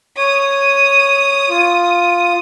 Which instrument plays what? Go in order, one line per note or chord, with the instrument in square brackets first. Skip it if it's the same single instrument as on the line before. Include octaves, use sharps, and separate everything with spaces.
[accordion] C#5 [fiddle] D#6
[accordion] F4